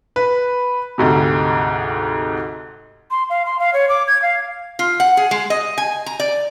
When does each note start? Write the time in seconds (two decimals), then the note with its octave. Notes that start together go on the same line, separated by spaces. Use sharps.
0.16 B4
0.98 D2 G#2 C3
3.11 C6
3.30 F5
3.46 C6
3.59 F5
3.73 C#5
3.89 D6
4.07 G#6
4.22 F5
4.79 F4
5.00 F#5
5.17 G#4
5.31 G#3
5.50 D#5
5.78 G#5
6.06 A#5
6.20 D5